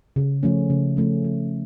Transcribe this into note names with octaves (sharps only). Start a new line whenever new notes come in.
C#3
F3 A3 C#4
C#3
F3 A3 C#4
F3